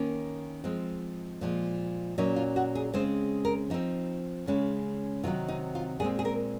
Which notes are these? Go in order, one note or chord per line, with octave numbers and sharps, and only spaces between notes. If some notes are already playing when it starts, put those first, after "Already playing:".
Already playing: D#3 A#3 C#4
F3 G#3 C4
A#2 F3 G#3
A#2 F#3 C#4 D#4
F4
F#4
G#4
C#3 G#3 C4 C5
A#4
F3 C4 D#4
C#3 G#3 C#4
C3 D#3 F#3 C4 F4
D#4
F4
A#2 G#3 C4 G#4
G#4
A#4